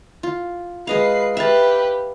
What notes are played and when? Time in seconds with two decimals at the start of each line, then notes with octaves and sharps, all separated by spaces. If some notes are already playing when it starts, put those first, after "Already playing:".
0.23 F4
0.87 G#3 B4 D#5 F5 C7
1.37 G4 B4 E5 F5 A5